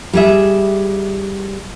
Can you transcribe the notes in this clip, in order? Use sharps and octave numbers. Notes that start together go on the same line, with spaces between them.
G3 G#4 E5